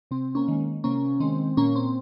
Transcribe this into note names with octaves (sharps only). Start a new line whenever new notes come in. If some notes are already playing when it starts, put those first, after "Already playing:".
C3 C4
A#3 C#4
D#3 G#3
C3 A#3 C#4
D#3 G#3 C4
A#2 A#3 C#4
C4